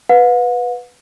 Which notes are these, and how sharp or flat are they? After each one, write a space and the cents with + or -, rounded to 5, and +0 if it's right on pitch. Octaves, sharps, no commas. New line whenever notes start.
B4 +0 F#5 -45